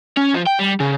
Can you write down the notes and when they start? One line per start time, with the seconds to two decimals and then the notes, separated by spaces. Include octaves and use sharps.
0.17 C#4
0.35 F3
0.47 G5
0.59 G3
0.80 C#3